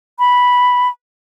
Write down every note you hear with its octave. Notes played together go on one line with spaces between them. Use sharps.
B5